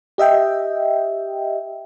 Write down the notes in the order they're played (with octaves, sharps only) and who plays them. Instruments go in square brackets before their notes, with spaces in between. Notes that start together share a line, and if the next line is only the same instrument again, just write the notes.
[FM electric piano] G4 D#5 E5 G5